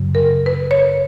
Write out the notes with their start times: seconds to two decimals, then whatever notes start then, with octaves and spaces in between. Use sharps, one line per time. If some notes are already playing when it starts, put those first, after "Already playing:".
Already playing: F#2 C#3 F#3
0.15 A#4
0.46 B4
0.71 C#5